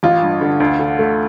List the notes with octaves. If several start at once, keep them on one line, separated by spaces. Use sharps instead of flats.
A1 F4
G2
D3
D2
D3
A3